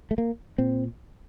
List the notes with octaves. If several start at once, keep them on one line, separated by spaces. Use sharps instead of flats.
A3
A#3
A#2 C4